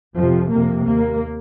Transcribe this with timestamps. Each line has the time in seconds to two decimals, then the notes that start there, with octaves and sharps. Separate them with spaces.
0.15 F2 C3 F3
0.50 F2 C3 A#3
0.85 D#2 A#3